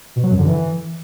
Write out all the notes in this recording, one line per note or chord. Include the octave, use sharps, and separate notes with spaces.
B2
F#3
F#2
D3
E3